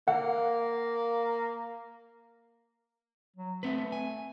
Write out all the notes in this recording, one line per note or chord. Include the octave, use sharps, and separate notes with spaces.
A#3 F#5
F#3
A3 C4 B4
G#5